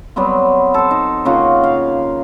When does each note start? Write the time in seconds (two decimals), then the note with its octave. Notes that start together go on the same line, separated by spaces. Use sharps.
0.16 F#3 G3 B3 C4
0.74 A4 C5
0.91 D#4
1.25 C#3 A#3 F4 F#4
1.64 F5